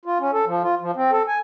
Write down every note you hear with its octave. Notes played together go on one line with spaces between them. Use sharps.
F4
C#4
A4
F3
F4
F3
C4
A4
G#5